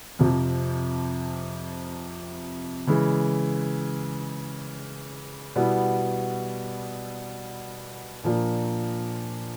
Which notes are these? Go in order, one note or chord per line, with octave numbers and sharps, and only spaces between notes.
F2 C3 F3
C#3 E3 G#3
B2 G3 B3 E4
A#2 F3 A#3 D4